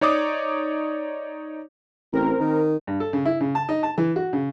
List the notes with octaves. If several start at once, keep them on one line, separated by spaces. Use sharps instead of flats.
D#4 C#5 D5 D6 D#6
A1 C4 A#4
D#3
G2
A4
C#3
E4
C#3
A5
D#4
A5
E3
F#4
C#3